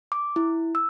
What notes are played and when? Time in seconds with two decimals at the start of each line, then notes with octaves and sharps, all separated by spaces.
0.12 D6
0.36 E4
0.75 E6